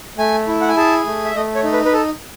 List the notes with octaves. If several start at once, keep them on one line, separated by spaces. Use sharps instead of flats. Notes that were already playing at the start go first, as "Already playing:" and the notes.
A3 G#5
E4
F#5
G#5
G#4 A5
A3
E5
A3 D#5
C#5
D#4
B4
B4
A4